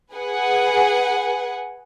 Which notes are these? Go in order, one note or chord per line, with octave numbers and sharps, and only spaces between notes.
G#4 B4 F#5 G#5